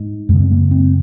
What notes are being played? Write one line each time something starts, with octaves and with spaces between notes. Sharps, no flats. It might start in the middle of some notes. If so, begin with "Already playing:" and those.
Already playing: G#2
F#2 C#3 G#3
C4
A#3
C4